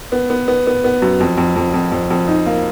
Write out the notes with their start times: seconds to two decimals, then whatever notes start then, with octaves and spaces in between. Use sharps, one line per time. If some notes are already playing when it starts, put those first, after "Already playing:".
0.12 B3
0.30 B3
0.48 B3
0.67 B3
0.84 B3
1.02 F#2
1.20 F2
1.38 F2
1.56 F2
1.74 F2
1.92 F2
2.10 F2
2.28 D#4
2.46 A#3